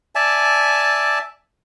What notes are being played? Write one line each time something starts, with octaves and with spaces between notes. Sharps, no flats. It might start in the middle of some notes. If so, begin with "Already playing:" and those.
D5 E5 G#5 A5